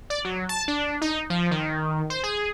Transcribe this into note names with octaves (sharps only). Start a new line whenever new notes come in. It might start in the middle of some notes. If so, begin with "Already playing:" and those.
D5
F#3
A5
D4
D#4
F3
D#3
C5
G#4